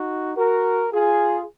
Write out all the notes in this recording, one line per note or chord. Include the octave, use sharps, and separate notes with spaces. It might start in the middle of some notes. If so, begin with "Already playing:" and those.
Already playing: D#4 F#4
F#4 A#4
F4 G#4